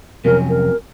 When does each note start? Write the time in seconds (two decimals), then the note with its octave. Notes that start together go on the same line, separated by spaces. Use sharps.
0.25 F2 C3 F#3 C#4 A#4
0.49 A#4